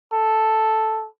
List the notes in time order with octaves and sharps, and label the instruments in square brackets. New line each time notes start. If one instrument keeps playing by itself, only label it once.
[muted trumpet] A4